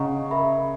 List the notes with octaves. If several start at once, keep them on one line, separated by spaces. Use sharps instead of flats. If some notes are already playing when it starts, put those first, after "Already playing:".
Already playing: C#3 G#4 D#5 F#5 A#5 C#6
A#4 E5 B5